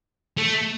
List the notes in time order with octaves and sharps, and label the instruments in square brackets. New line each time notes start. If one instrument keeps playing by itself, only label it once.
[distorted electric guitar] A3